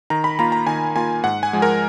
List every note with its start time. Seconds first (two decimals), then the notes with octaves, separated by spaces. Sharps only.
0.10 D#3 A#5
0.24 B5
0.39 A#3 F4 A#5
0.52 A#5
0.67 D#3 G#5
0.96 A#3 F4 G#5
1.24 G#2 F#5
1.43 G#5
1.53 F3 G#3
1.62 A#4